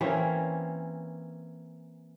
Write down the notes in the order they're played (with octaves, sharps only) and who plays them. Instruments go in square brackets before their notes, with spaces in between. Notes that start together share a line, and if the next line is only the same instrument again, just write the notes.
[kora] E3 A#3 C4 C#4